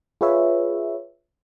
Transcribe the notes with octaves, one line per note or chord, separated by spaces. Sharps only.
F4 G#4 B4 C#5 E5